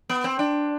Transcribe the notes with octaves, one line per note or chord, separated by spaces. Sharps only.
B3
C4
D4